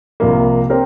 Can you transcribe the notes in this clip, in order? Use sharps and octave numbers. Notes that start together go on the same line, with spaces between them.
C2 C3 F3 A#3
C4 G4 A#4